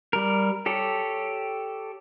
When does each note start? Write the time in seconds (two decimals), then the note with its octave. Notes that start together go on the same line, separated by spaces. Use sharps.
0.13 G3 A#4
0.66 G4 A4 C#5